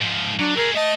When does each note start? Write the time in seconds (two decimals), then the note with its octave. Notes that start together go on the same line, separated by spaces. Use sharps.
0.01 G#2 F3
0.39 F#3 D4
0.57 A3 G#4 A#4
0.75 A3 D#5 A5